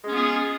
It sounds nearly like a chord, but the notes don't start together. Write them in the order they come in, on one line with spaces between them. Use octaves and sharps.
G#3 C#4 B3 F4 G#4